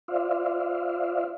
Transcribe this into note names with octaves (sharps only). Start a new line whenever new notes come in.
F4 C5 D5 E5 F5